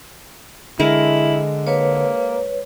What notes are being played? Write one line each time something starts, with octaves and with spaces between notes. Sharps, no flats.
D3 G#3 E4 A#4
A#3 B4 C#5